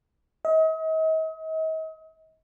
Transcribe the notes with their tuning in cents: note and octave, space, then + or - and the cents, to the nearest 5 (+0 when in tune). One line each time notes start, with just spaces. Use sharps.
D#5 +40